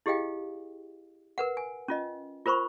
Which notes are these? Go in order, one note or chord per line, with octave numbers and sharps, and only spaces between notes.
E4 G4 G#4 D#5 F5 G5
A#4 B4 F#5
G#5
C#4 F4 D#5
F4 A#4 C5 B5 C#6